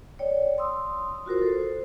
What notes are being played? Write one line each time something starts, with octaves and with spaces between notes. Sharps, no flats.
C#5 D5 G5
C6 D#6 E6
F4 F#4 A#4 C5
A4 C5